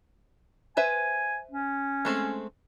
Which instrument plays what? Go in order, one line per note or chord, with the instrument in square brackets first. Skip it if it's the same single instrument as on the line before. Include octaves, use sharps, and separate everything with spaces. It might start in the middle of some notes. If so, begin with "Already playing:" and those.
[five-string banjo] B4 C5 E5 [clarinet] G#5
[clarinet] C#4
[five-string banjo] G#3 A3 C4